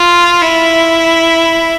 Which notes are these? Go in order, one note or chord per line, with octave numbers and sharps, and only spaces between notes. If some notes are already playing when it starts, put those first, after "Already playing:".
Already playing: F4
E4